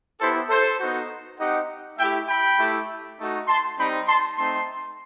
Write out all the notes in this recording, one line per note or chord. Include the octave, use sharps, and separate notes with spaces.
B3 E4 G4 A4 C5
A4 C5
B3 D#4 F#4
C4 D#4 G4 D#5 F#5
A3 E4 G4 E5 G5
G5 B5
A3 E4 G4
A3 D#4 F#4
A5 C6
G3 C4 D#4 G5 B5
A5 C6
A3 C4 D#4 A5 C6